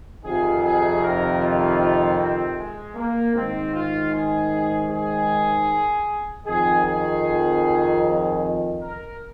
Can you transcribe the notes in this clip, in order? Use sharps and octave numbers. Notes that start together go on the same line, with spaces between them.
F2 C3 D#3 G#4
G#4
A#4
F4
F4
C4
G#3
A#3
G#2 D#3 C4
F4
G#4
G#4
F2 D#3 G#4
G#4
A#4